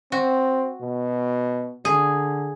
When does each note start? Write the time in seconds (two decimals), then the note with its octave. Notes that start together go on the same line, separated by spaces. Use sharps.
0.12 C4 F#4
0.81 B2
1.85 D3 G#4